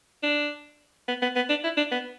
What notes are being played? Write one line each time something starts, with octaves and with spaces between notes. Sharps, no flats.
D4
B3
B3
B3
D4
E4
D4
B3